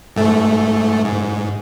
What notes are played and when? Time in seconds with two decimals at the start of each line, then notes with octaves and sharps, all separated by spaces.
0.16 G#2 A3
1.05 G#2